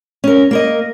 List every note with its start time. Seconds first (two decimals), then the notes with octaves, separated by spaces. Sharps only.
0.24 C#4 A#4
0.51 A#3 A#4 D#5